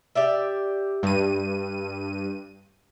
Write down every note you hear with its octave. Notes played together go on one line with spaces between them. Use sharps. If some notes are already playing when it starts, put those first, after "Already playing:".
G4 D5 E5
G2 D#7